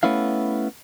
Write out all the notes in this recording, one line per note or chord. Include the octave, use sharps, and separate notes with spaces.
A3 B3 C#4 E4 F5